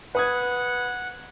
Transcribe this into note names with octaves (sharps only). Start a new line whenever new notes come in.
B4 F#5 D#6 G#6